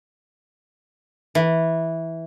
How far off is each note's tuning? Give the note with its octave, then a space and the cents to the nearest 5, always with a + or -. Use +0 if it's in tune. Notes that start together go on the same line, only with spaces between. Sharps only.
E3 -10